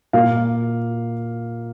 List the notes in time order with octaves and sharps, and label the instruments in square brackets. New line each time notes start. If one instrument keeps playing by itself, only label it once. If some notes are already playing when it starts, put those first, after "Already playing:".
[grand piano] A#2 A#3 F5